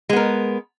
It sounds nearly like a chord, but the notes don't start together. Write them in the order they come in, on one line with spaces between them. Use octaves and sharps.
G#3 B3 A#4